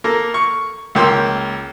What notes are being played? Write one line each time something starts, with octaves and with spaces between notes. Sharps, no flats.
A#3 A4 A#5
C#6
C#2 A#3 G5 C6 E6